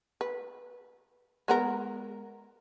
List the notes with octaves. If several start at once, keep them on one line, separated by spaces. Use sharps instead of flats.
B4
G#3 B3 A#4